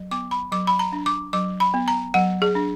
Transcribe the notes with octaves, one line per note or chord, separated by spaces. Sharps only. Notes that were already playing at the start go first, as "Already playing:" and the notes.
Already playing: F#3
B3 D6
B5
F#3 D6
B5
A#5
D4
D6
F#3 D6
B5
B3
A#5
F#3 F#5
G#4
D4